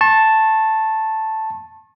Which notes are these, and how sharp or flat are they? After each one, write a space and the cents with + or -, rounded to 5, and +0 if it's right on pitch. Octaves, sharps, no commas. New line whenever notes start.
A5 +0 C#6 -40